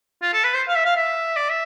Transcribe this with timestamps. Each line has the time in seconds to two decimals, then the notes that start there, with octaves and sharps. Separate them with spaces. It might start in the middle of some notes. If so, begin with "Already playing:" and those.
0.23 F4
0.33 A4
0.44 B4
0.55 C5
0.68 F5
0.76 E5
0.85 F5
0.97 E5
1.37 D5
1.50 E5